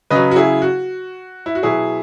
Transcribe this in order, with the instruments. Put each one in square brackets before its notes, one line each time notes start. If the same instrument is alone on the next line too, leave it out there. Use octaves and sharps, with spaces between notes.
[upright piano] C#3 F#3 B4 D#5
F#4
E4 G#4
F#4
E4
F#4
B2 F#3 E4 G#4